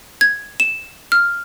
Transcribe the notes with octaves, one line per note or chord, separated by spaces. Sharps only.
G#6
E7
F6